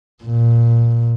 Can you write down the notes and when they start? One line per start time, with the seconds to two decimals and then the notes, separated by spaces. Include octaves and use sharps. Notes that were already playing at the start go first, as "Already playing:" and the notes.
0.24 A#2